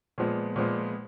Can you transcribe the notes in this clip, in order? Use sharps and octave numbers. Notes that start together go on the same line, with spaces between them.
A#2 F3 G#3 B3
A#2 F3 G#3 B3